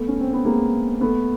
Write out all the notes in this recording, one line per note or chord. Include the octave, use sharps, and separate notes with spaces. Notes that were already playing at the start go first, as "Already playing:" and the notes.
Already playing: A3 B3
C#4
C4
B3
G#3 A#3
A3 B3